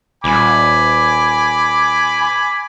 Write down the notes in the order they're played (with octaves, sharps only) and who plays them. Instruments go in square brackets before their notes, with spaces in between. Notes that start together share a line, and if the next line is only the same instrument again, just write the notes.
[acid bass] D#1 [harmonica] G#5 B5 D6